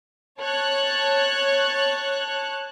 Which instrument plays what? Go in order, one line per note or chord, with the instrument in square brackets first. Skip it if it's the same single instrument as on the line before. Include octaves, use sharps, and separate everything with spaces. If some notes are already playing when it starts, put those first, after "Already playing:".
[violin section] C#5 A5 F#6